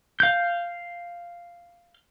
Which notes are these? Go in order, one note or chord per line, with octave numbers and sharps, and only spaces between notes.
F5 G6